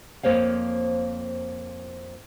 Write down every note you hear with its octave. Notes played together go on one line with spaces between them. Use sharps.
F2 G#2 A#3 C5 C#5 F5